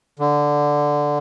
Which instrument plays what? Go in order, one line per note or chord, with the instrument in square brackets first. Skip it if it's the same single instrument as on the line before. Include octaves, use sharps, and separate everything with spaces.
[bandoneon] D3